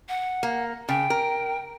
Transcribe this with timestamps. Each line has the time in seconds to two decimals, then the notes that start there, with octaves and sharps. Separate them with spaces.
0.09 F#5
0.43 A#3
0.89 C#3 G5
1.10 A#4